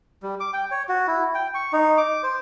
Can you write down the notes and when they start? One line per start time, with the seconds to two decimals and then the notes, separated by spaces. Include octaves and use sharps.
0.23 G3
0.40 D6
0.53 G5
0.71 C#5
0.89 F#4
1.07 E4
1.35 G5
1.55 C#6
1.73 D#4
1.98 D6
2.23 C5